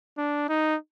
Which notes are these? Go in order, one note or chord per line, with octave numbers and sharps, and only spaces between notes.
D4
D#4